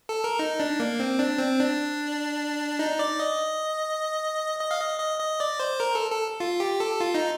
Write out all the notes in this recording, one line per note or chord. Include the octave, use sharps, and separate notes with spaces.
A4
A#4
D#4
D4
A#3
C4
D4
C4
D4
D#4
D5
D#5
D#5
F5
D#5
D#5
D#5
D5
C5
A#4
A4
A4
F4
G4
A4
F4
D#4